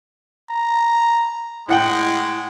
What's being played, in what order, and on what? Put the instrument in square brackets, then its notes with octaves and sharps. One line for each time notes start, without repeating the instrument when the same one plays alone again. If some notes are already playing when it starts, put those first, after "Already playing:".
[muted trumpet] A#5
[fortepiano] A2 F#5 G5 [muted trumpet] G#3